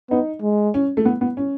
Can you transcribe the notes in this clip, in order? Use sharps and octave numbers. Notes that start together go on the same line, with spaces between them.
B3 D#4
G#3
C#4
A3
B3
B3
C#4